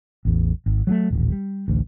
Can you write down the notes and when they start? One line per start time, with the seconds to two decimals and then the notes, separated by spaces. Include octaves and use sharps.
0.25 A1 E2
0.66 G#1
0.87 F#3 G3 A3
1.10 D#1 A1
1.32 G3
1.68 A1 D2